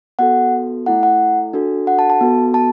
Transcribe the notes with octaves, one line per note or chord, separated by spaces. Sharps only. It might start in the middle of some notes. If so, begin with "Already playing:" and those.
B3 F#4 A4 F#5
A3 E4 A4 F#5
F#5
D4 F#4 A4
F#5
A5
A5
B3 F#4 A4
A5